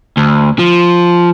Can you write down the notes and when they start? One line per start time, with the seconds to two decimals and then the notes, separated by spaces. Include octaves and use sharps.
0.17 D2
0.59 F3